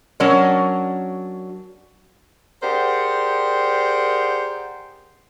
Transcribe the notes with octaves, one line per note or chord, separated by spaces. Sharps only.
F#3 C#4 D4 A#4 C#5
G4 G#4 A#4 C5 D5 F#5